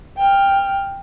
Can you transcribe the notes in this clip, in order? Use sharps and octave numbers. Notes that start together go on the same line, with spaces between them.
G5 F6